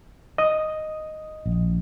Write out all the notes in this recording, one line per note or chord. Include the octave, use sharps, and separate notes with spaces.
D#5 D#6
A#1